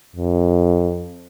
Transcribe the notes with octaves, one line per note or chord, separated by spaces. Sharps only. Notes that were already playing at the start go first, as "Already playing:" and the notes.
F2